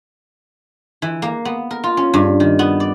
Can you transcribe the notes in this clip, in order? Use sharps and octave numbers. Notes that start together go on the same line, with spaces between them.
E3
A#3
B3
A#4
F4
C#4
G2
D#3
B3
D5